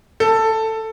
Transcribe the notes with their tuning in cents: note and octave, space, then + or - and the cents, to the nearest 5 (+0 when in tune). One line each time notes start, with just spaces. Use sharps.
A4 +10